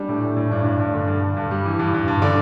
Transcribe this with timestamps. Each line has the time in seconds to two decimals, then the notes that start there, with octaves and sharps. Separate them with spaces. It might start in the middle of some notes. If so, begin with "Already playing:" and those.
Already playing: G3 D4
0.09 A2
0.23 A2
0.36 A2
0.51 G2 D4
0.65 G2
0.80 G2
0.94 D3
1.07 G2
1.22 G2
1.37 G2
1.51 G3
1.65 E3
1.79 G2
1.94 G2
2.08 G2
2.22 D3 D5